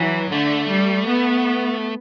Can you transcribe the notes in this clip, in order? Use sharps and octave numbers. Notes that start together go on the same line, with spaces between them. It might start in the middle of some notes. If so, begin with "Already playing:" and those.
Already playing: E3 F#3
D3 A3
G3
B3